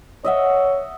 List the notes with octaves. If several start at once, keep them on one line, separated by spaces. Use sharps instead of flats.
C#5 D#5 E5 F#5